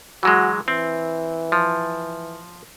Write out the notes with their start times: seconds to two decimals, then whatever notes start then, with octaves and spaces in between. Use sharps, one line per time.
0.23 E3 F#3 G#3 F#4
0.68 E3 C4
1.52 F3